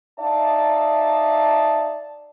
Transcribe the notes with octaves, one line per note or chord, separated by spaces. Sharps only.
D#4 D5 E5 F5 A5